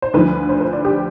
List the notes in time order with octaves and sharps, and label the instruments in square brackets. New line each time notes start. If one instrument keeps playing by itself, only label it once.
[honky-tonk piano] C5
D2 D3 F3 B4
C5
B4
D5
G4